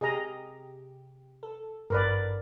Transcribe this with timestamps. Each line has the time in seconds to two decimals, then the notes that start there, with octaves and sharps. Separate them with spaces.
0.01 C3 G4 G#4 D#5 A#5
1.43 A4
1.90 G#1 G2 A#4 B4 D5